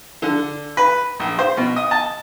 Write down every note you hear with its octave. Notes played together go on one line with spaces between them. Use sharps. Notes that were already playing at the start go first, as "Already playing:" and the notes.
D3
B4
A#1
C5
B2
D#5
A5